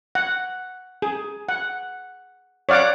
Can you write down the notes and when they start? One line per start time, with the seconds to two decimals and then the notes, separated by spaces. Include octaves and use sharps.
0.15 F#5
1.02 G#4
1.49 F#5
2.69 C#5 D5 F5 F#5 D6